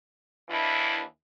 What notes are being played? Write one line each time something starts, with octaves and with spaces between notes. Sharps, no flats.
D#2 E3 D4 E4